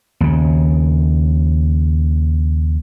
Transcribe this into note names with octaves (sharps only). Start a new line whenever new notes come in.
D#2 C#3